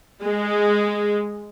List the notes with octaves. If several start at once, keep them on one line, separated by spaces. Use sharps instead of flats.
G#3